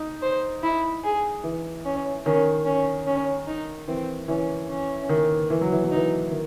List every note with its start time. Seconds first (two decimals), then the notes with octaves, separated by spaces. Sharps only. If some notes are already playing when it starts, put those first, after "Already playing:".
Already playing: D#4
0.23 C5
0.63 E4
1.04 G#4
1.44 E3
1.85 C#4
2.25 D#3 C#4
2.65 C#4
3.06 C#4
3.48 D#4
3.88 E3 C4
4.28 E3 C#4
4.69 C#4
5.09 D#3
5.50 E3
5.61 F#3
5.72 E3
5.84 F#3
5.91 E3 D#4
6.31 D#3